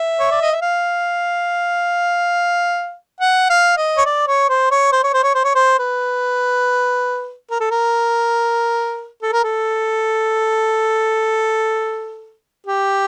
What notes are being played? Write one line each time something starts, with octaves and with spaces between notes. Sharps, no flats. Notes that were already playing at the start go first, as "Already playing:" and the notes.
Already playing: E5
C#5
D5
D#5
E5
F5
F#5
F5
D#5
C#5
D5
C#5
C5
C#5
C5
C#5
C5
C#5
C5
C#5
C5
B4
A#4
A4
A#4
A4
A#4
A4
G4